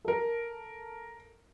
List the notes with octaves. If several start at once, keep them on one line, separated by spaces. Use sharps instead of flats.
A4 A#4